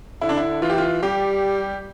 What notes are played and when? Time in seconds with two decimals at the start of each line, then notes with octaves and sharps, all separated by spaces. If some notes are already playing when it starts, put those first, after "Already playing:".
0.21 D3 E4
0.29 D4
0.37 E4
0.62 E3 F4
0.70 G4
0.78 F4
1.02 G3 G4